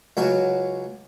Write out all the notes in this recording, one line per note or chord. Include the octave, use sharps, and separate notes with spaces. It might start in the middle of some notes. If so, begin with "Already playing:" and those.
C#2 F#3 F#4